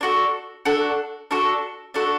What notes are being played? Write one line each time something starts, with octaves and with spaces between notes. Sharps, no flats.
D4 F#4 A4
D4 F#4 A4
D4 F#4 A4
D4 F#4 A4